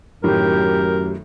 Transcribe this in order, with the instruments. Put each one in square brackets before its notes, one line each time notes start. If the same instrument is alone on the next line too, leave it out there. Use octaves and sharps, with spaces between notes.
[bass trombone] F#2 [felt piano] A2 D#3 [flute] G4 [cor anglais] A#4